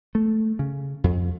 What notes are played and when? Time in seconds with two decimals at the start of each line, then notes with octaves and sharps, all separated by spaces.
0.15 A3
0.59 C#3
1.04 F2